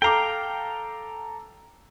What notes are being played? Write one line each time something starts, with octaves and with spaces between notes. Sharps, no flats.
A4 F5 G5 A#5 D6